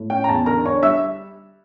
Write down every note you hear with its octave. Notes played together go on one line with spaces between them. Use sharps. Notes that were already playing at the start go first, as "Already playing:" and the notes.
Already playing: A2
C#4 G5
A#5
E2 A5
D3 A#4 A#5
D4 C#5 C#6
G3 E5 E6